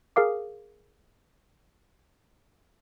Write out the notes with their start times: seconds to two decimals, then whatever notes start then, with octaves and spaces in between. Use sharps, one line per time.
0.16 G#4 A#4 F5 D6